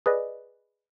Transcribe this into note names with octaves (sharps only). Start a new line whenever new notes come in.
G#4 B4 D5 D#5